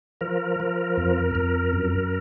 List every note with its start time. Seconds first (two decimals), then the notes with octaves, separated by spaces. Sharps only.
0.21 F3 A#4
0.60 F3
0.97 F2
1.35 F2
1.73 F#2